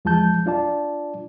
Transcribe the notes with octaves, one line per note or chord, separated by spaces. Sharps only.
E2 F3 G#3 A5 G6
D4 F4 D5 A5